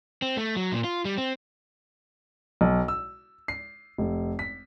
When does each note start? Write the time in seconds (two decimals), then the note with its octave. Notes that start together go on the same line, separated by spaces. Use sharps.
0.22 C4
0.37 A3
0.56 F#3
0.72 A#2
0.84 F4
1.05 G3
1.18 C4
2.61 B1
2.88 E6
3.48 C7
3.98 F1
4.39 B6